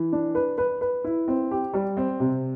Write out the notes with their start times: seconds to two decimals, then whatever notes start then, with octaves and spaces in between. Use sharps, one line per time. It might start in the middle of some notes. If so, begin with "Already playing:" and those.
Already playing: E3
0.13 D4
0.35 B4
0.58 B4
0.81 B4
1.04 E4
1.28 C4
1.51 G4
1.74 G3
1.97 C4
2.20 C3